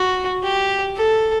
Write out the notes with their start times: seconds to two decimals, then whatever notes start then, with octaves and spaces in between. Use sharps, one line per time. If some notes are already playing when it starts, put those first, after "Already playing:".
Already playing: F#4
0.43 G4
0.97 A4